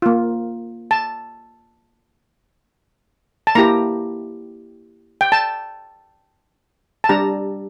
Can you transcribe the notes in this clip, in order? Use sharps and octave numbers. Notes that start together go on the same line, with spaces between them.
A#3 F4
A5
A5
A#3 E4 G4 A#5
G5
A5
A5
G3 D4 G4 A#5